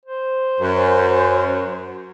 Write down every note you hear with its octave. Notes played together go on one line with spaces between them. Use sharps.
C5
F#2